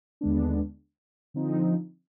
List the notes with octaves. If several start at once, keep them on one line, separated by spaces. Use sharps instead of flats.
D#2 D3 G#3 B3 D4
D3 F3 C4 D#4